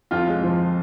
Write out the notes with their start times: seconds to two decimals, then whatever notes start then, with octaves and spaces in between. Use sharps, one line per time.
0.11 F2 F4
0.28 G#3
0.43 F3